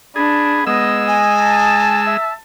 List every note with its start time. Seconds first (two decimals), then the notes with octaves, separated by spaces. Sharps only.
0.16 D4 G#4 B5
0.67 G#3 B3 D#5 E6
1.07 G#5
1.37 A5
2.07 E5